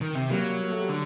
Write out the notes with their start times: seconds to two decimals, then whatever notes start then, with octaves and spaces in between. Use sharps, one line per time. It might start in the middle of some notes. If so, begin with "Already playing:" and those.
0.01 D#3
0.15 C3
0.30 F#3 G3 A#3
0.60 A#3
0.70 A3
0.81 G3
0.89 D3